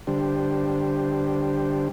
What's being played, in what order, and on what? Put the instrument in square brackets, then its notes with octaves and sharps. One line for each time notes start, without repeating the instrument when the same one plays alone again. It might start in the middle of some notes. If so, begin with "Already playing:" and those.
[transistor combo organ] D3 G3 D4 G4 C5